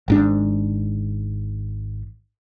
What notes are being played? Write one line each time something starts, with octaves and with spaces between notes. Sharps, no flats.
G#1 G#2 D4